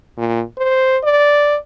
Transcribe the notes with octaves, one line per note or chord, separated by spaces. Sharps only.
A#2
C5
D5